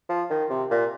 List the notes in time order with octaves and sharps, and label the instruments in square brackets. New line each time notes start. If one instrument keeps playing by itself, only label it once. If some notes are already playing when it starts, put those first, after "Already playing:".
[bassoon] F3
D#3
C3
A#2